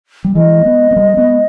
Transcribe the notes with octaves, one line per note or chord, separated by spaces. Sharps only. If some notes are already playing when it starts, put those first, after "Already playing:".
G3
E3 G#3 D#5
A#3
G#3 B3
B3
G3 A#3
G#3 B3